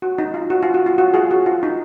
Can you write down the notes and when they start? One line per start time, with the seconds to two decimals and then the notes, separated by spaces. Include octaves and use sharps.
0.02 F#4
0.18 D#4
0.34 F4
0.50 F#4
0.63 F4
0.74 F#4
0.86 F4
0.98 F#4
1.14 F4 G#4
1.31 F#4
1.46 F4
1.63 D#4